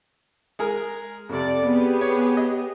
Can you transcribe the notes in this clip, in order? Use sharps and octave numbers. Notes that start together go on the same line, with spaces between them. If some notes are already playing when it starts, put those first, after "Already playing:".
G#3 G#4 A#4
F2 C3 G4 A4 D5
B3 G4 G#4
C#5
D#5